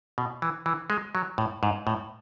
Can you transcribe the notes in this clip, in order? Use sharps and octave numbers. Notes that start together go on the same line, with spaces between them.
B2
E3
E3
G#3
F#3
A2
G#2
A2